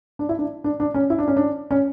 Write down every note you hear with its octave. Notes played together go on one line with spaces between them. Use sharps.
D4
E4
D4
D4
D4
C#4
E4
D4
C#4
D4
C#4